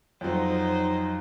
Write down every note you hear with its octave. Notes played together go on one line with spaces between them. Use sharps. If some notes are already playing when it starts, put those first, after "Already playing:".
F2 F#3 D#4 C5